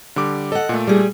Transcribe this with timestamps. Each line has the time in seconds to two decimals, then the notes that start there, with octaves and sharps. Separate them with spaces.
0.16 D3 G3 D6
0.52 A4 D#5 F#5
0.69 A#2 A3
0.87 G3 G#4